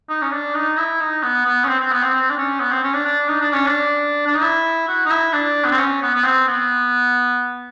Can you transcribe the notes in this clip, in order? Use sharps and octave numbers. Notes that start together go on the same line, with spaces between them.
D#4
C#4
D4
D#4
E4
D#4
B3
B3
C#4
C4
C4
B3
C4
C4
D4
C#4
B3
C4
C#4
D4
D4
D#4
D4
C#4
D4
D4
D#4
E4
F#4
D#4
E4
D4
B3
C4
C#4
B3
B3
C4
B3